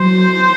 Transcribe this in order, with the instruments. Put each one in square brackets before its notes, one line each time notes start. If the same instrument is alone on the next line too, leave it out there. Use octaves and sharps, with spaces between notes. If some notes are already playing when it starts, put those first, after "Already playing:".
Already playing: [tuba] F#3 [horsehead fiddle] C5